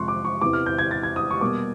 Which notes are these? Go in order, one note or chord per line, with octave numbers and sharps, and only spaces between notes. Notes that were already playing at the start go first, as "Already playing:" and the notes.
Already playing: F2 C3 F3 G#3 C6 C#6 F#6
D6
C#6
E2 C3 E3 D6
F6
G6
G#6
A6
G#6
D#6
C#6
B2 G3 A#3 D6